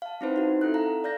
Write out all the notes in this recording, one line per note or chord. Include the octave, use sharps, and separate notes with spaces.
F5 A5
C4 C#4 D#4 E4 B4 C5
D#4 F#4
C4 E4 A4 F#6
A4 F5 A#5
D5 F5 G6 A#6